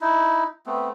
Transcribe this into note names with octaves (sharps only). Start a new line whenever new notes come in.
D#4 E4
A3 B3 C4